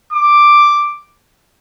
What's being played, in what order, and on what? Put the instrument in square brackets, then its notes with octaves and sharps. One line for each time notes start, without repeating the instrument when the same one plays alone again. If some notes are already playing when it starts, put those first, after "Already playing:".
[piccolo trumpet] D6